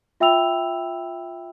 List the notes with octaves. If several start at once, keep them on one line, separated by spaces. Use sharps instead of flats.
F4 E5 G5 B5 E6 F7